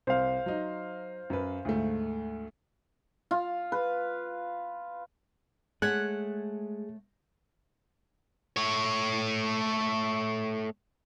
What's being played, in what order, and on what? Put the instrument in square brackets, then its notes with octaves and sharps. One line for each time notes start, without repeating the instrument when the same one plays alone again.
[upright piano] C2 [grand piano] C5 F5
[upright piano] F#3 D#4
F#2 B4
D2 G#2 A3
[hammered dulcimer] F4
B4
[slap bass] G#3 [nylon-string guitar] A3 C#5 F#5 [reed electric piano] G#4 [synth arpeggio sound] F#6 G#6
[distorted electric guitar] A3 C#5